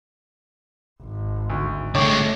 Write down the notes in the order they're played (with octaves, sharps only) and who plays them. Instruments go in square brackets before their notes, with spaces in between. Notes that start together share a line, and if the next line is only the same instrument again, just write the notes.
[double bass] G#1
[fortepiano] D2
[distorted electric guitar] D3 G#3 [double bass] A3 [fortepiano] C#5 G5 D6